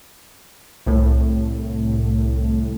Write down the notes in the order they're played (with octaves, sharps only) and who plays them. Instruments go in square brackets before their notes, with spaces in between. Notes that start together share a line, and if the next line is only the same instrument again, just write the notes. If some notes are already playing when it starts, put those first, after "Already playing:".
[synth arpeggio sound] C2 A2